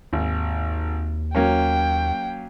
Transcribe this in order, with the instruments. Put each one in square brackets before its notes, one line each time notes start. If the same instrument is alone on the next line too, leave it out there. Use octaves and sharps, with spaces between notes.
[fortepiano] G#1 [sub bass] D#2
[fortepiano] F#3 A#3 C#4 [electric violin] G5